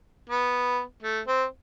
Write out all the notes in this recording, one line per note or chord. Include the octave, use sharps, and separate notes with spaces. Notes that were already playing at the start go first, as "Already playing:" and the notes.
B3
A3
C4